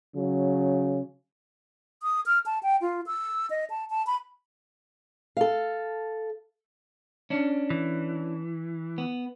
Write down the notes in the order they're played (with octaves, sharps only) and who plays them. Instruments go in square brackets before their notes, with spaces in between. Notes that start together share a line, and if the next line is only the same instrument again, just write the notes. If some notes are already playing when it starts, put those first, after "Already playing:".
[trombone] C#3 [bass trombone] F#3
[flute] D#6
F6
A5
G5
F4
E6
D#5
A5
A5
B5
[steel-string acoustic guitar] A4 F5
[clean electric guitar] C#4 D4
[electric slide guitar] E3
[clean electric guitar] B3